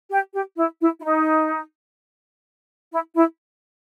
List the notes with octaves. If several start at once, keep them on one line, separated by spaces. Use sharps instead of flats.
G4
G4
E4
E4
E4
D#4
E4
E4